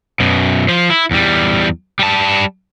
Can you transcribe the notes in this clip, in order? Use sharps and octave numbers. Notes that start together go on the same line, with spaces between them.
F#2 B2
F3 C5
E4
E2 G3
G3 A5